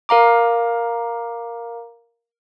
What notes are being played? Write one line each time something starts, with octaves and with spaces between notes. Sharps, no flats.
A#4 F5 A#5 D6